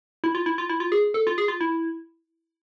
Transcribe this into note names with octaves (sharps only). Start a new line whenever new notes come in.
E4
F4
E4
F4
E4
F4
G#4
A4
F4
G#4
F4
E4